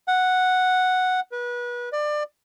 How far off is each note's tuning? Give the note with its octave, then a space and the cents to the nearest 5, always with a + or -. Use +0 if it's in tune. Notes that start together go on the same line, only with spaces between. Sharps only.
F#5 -5
B4 -30
D5 +25